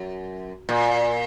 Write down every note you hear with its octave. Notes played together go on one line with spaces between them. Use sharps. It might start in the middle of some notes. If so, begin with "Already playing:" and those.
Already playing: F#2
A#2